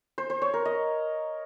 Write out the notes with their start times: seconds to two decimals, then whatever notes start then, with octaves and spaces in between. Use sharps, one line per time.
0.18 C5
0.30 C5
0.42 C#5
0.54 A#4
0.65 D#5